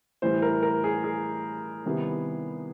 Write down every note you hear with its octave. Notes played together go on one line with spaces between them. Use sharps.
A2 E3 G3 C5
A#4
A#4
G#4
G#4
C3 D#3 G3 B3 E4